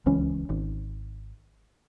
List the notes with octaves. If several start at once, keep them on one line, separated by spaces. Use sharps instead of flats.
D1 C#2 E3 C#4
G#1